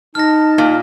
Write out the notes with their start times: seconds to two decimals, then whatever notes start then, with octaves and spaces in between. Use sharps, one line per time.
0.15 D#4 A5 F6 A#6
0.58 A#2